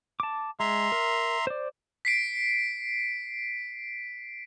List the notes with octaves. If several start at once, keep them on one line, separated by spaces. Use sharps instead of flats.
A5 D6
G#3 E5 A#5 C6
A#4
C5 D5
B6 C7 D7